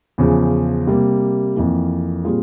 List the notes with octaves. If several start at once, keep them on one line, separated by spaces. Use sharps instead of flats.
E2 C#3 F3
C3 G3 A#3
F2 E3 A#3
A#2 G3 C4 F4 G#4